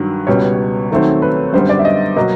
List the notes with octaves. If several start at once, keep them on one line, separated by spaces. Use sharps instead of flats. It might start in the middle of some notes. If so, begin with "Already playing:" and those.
Already playing: G2 D#3 F#3
C#2 B2 G3 B3 C#5
D#2 D#3 F#3 A3 C4
B4
F#2 D3 G3 B3 C5
D5
E5
D#5
B2 F#3 A#3 D#5